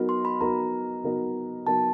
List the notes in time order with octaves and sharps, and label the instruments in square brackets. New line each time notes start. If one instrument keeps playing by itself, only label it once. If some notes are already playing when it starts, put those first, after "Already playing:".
Already playing: [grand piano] F#3 B3 D#4 F#4 A#4
[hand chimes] C6
B5
[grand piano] F#3 B3 D#4 F#4 A#4 [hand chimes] A#5
[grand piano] F#3 B3 D#4 F#4 A#4
[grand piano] F#3 B3 D#4 F#4 A#4 [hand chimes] A5